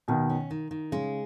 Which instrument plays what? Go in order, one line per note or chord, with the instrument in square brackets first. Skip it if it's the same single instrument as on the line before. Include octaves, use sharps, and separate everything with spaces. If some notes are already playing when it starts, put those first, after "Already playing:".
[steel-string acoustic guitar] D#2 [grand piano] B2 D#3
[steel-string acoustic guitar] C#4
D#3
D#3
[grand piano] C#3 [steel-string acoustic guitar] G#3